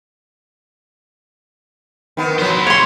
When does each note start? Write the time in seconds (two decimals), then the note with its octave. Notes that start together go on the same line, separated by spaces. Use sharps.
2.17 D#3 B3
2.39 F#3 B3 E4 C5
2.67 C#5 C6